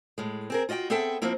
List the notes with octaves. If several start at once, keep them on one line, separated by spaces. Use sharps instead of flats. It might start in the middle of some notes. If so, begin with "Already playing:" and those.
A2 G#3
C4 G#4 A#4
F4 F#4 D#5 E5 G5
B3 C4 G#4 A4 E5 G5
F3 A#3 C4 E4